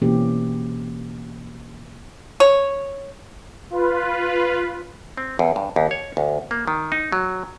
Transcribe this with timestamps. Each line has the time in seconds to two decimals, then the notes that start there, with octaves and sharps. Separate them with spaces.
0.02 B2 E3 A#3 C4 C#4 G4
2.40 C#5
3.70 F4 B4
5.17 C4
5.39 E2
5.56 G2
5.76 D#2
5.91 C#5
6.17 D2
6.51 A#3
6.68 D#3
6.92 D#4
7.12 F#3